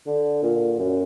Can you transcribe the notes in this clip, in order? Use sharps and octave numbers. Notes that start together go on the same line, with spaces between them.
D3
A#2
F#2